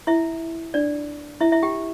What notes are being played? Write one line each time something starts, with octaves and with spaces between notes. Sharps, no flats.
E4 E5
D4 D5
E4 E5
E4 E5
G4 G5